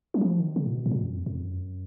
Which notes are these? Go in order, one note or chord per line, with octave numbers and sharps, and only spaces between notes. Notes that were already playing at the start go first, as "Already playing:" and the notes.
F#3
F3
D#3
C#3
A#2
B2
G#2
A#2
F#2
F2
F2
F#2